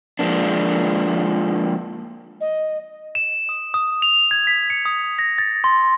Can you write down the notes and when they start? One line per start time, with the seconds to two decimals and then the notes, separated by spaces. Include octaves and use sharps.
0.19 F3 G#3 A#3 D4
2.41 D#5
3.15 E7
3.49 D#6
3.74 D#6
4.02 F7
4.31 G#6
4.47 B6
4.70 C#7
4.85 D#6
5.19 A#6
5.38 A6
5.64 C6